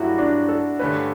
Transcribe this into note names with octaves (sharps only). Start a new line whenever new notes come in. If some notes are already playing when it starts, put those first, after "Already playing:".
Already playing: G2 F#3 A3 E4 F#4
D4
A4
G2 D3 A3 C#4 B4